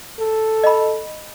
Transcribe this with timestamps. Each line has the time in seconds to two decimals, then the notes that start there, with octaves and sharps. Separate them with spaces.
0.19 A4
0.64 D#5 B5